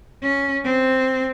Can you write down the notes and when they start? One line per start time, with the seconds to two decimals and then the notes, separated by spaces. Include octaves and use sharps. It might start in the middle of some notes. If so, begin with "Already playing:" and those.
0.23 C#4
0.65 C4